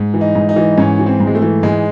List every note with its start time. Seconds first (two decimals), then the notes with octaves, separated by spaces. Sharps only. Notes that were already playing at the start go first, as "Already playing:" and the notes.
Already playing: G#2
0.14 E3
0.21 D#4
0.35 G#2
0.49 D#4
0.56 E3
0.78 G#2 C#4
0.99 E3
1.06 C4
1.20 G#2
1.27 G#3
1.35 A3
1.42 E3
1.63 G#2 G#3